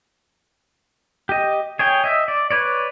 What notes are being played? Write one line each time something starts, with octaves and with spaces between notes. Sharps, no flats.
G4 D#5
G#4 C#5 G5
D#5 E5
D5
B4 C#5 D5